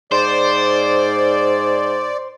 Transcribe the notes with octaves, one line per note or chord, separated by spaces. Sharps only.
G#2 C5 D5